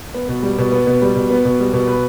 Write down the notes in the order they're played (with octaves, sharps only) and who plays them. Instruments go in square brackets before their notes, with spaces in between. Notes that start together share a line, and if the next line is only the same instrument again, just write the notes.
[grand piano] B3
B2
G3
B2
B3
B2
G3
B2
B3
B2
G3
B2
B4